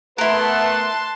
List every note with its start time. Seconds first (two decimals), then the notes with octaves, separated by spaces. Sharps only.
0.18 A3 B3 E4 A#4 B4 A5 C6 F#6